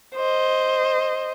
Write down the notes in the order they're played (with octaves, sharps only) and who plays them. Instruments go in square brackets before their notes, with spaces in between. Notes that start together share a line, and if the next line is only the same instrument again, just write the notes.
[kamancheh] C5 D#5